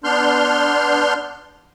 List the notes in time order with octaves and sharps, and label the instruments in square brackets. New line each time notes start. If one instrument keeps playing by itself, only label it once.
[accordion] B3 D4 C6 F6 G6